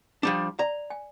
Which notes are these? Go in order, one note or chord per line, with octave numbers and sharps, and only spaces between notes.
F3 G3 D4
D5 A#5
G#5